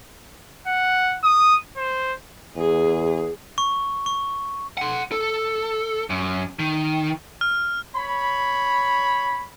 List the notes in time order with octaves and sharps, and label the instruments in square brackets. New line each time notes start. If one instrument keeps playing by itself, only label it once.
[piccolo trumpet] F#5
D#6
C5
[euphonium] E2 [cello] G#4
[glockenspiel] C#6
C#6
[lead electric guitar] F#5 C6
A4
F#2
D#3
[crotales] F6
[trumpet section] C#5 B5